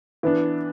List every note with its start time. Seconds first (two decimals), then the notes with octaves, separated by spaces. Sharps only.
0.23 E3 B3 D4